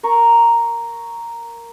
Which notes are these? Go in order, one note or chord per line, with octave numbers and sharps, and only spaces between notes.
A#4 A#5 C#6